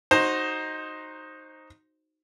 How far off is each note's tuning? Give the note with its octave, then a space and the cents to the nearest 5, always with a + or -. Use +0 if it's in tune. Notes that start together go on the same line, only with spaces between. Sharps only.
D#4 +0 F#4 +0 C5 +15